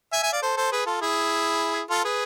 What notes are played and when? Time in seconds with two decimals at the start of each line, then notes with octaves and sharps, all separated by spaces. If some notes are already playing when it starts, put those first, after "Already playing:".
0.13 E5 G#5
0.23 E5 G#5
0.32 D5 F5
0.42 A4 C5
0.57 A4 C5
0.72 G#4 B4
0.86 F4 A4
1.01 E4 G#4
1.90 F4 A4
2.04 G#4 B4